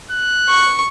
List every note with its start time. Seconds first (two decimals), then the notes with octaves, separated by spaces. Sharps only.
0.11 F#6
0.50 C#6